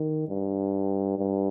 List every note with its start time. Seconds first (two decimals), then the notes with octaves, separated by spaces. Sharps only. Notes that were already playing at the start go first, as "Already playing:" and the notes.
Already playing: D#3
0.28 G2
1.19 G2